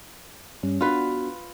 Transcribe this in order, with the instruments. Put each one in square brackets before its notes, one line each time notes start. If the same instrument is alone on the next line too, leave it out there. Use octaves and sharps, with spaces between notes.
[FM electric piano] G2 G3 C#4
[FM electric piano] B3 D4 F#4 [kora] F4 B4